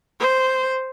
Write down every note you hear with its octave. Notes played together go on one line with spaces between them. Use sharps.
C5